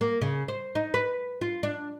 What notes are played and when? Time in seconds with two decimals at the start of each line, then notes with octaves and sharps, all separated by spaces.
0.01 A#3
0.21 C#3
0.48 C5
0.75 D#4
0.94 B4
1.41 F4
1.63 D4